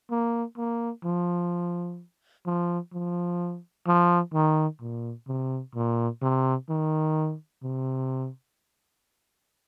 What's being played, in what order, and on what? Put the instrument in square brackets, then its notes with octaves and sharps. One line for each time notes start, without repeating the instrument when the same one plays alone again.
[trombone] A#3
A#3
F3
F3
F3
F3
D#3
A#2
C3
A#2
C3
D#3
C3